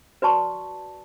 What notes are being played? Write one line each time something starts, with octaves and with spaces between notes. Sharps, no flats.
F#4 B4 D5 A5 C#6